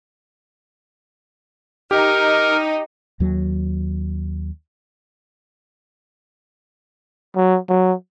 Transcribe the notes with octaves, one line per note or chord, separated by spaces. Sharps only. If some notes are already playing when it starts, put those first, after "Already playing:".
D#4 G4 A#4
D#2 F#3
F#3
F#3